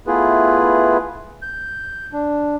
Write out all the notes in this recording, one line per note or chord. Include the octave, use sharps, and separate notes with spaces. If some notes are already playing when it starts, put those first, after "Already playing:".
A3 B3 E4 F4 G#4 B4
G6
D4